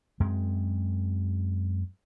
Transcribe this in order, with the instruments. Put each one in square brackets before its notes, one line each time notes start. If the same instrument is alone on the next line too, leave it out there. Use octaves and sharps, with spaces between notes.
[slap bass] F#2 G#3 C4